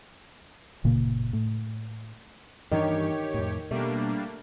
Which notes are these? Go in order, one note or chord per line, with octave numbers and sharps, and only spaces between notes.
F#1 A#2 C#3 A#3
A2
G2 D#3 E3 D4 G4 C#5
F2 A2
B2 G3 A3 A#3 D4